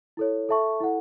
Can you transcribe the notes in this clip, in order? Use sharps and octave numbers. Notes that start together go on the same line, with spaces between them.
E4 A4 C#5
A4 E5 A5 C#6
E4 A4 F#5